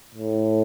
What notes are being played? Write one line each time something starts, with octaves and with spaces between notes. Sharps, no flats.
A2